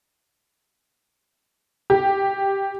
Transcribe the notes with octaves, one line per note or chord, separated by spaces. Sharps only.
G4